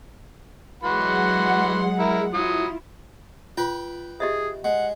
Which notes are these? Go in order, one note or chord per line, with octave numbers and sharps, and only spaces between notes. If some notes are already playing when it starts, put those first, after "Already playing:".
E3 F#3 G#3 F#4 F#5 C6
E4 A#4
F#3 E4 F4 D#6
F4 B4 G5
G4 G#4 D#5 E5
G#3 F#5